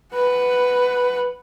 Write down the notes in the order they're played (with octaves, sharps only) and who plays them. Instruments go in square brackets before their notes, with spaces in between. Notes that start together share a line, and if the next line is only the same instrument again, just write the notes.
[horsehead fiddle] B4 F#5